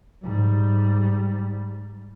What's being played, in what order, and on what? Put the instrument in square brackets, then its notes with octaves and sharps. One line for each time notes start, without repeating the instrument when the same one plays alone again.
[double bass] G#2 G3